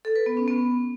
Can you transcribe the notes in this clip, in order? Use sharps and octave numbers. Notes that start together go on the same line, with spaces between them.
A4
B4
B3
C#4
B3